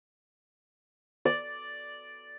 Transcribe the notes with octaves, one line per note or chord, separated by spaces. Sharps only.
D5